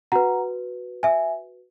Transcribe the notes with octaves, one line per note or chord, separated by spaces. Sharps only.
F#4 B4 F#5 A#5
E5 G#5